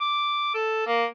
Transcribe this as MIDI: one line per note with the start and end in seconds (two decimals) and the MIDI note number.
0.01 0.52 86
0.55 0.86 69
0.87 1.05 58